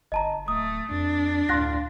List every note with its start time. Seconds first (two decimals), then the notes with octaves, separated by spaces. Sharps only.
0.12 G1 D#5 A5 A#5
0.48 D1 A3 D#6
0.91 F2 D4
1.49 D2 A2 F4 F#6 A#6